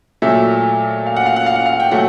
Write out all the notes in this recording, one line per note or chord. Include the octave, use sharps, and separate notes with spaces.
A#2 F#3 A3 E5
F5
F#5
F5
F#5
F5
F#5
F5
G5
A#2 F#3 A3 F#5